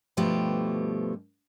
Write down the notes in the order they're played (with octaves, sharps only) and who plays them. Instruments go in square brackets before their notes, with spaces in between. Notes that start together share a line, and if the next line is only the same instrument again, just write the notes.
[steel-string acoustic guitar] G2 B2 F3 A3 G4